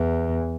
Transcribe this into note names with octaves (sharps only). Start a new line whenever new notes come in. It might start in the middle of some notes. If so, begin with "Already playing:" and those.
Already playing: E2